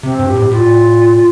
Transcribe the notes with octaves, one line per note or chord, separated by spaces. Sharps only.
C3 C4
G2
G4
A2
A2 F4